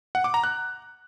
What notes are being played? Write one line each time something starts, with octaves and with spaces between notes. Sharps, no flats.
F#5
D6
A#5
F#6